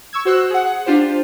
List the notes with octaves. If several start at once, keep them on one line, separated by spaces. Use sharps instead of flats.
C#6 E6 G#6
F#4 C5 E6 F#6
G#4 F#5
D4 F4 G4 C5